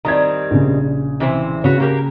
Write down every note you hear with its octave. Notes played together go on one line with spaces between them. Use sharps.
D#3 G3 C4 A#5 G#6
A#1 C#3
C3 E3 C5
C#3 F#4 B4 C#5
A#3 G4 A#4